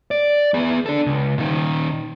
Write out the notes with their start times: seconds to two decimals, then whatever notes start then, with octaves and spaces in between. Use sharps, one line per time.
0.11 D5
0.54 B3 G#4
0.86 D4 A4
1.06 C#2
1.38 A#2 D#3